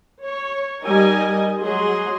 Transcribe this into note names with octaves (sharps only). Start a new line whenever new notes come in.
C#5
G3 D#4 G4 A#4 D#5 G#5
F#3 G#3 F#4 G#4 D#5 C6